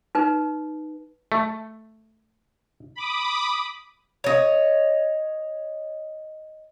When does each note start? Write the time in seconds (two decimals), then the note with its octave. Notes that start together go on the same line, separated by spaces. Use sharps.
0.15 D#4 B4
1.32 A3
2.95 B5 D6 D#6
4.24 C#5 D#5